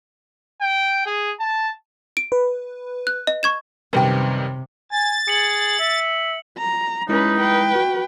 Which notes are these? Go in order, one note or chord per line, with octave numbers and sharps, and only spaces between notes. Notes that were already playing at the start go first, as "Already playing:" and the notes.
G5
G#4
A5
D7
B4
F#6
D#5
C#6 G#6 E7
F#2 C3 D#3 G3 B4 G5
G#5 A6
G#4 C#7 F#7
E5
A#5
G#3 C#4 D#4 E4 B4
B4 G5
F#4